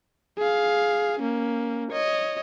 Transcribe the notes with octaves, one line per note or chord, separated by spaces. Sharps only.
G#4 F5
A#3 C#4
C#5 D#5